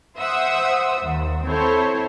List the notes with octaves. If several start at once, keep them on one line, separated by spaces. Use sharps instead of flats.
C5 E5 F#5 D#6 E6
D#2
C4 E4 A4 C5 C#5